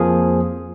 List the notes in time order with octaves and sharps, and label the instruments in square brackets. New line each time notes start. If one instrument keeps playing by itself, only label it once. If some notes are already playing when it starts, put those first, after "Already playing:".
Already playing: [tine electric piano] F2 F3 A#3 G#4